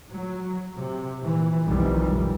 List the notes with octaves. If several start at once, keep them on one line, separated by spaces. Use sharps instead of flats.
F#3
C3
A#2 E3
F1 B1 F2 D#3 E3 G3